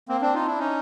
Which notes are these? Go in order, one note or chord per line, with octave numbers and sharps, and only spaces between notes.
A#3 C4
C4 D4
D#4 F4
D4 E4
C#4 D#4